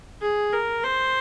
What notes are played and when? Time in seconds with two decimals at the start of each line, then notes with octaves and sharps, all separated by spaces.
0.22 G#4
0.53 A#4
0.84 C5